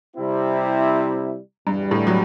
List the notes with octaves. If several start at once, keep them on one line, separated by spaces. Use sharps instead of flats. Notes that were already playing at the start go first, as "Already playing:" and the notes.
C3 G3 C4 E4
E2 G2 B2 G3 D4
A2
F#3